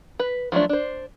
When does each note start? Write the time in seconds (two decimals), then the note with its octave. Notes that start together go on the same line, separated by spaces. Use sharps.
0.19 B4
0.52 F3 F#3 A3 D4
0.69 D4 C5